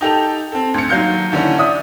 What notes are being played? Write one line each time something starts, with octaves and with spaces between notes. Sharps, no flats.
D#4 G4 A4 F7
C4 A4
D2 C#7
D#2 F#3 F5 G6 C#7
D#2 D3 E3 C#4
D5 E5 D#6